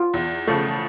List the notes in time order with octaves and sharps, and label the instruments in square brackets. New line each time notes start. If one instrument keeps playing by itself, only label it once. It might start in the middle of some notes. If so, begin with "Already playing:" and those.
Already playing: [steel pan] F4
[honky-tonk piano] E2
C#3 F3 A3